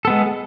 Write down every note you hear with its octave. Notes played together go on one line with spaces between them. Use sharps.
G#3 B3 A4